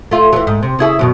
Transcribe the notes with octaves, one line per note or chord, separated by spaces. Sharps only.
A3 F4
E3 F#3
G#2
C3
C#3 E4 G#4
F#2 B2 D#3